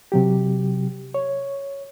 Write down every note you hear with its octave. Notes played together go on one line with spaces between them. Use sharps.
C3 F#3 G4
C#5